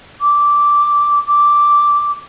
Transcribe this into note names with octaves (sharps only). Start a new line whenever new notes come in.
D6
D6